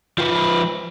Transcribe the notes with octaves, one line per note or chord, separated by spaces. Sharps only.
F3 B4